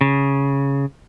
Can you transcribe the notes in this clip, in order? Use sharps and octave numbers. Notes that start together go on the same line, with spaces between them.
C#3